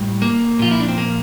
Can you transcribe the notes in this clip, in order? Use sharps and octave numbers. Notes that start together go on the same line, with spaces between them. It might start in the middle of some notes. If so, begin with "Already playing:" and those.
Already playing: A2 G3
A#3
A#2 F3 F4
E4
D4
C4
A#3